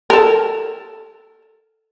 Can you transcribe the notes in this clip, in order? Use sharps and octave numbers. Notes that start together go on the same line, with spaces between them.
A4 A#4